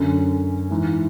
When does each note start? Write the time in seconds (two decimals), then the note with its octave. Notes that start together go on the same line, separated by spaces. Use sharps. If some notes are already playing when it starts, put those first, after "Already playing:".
Already playing: F#2 D3 C#4
0.71 G#2 E3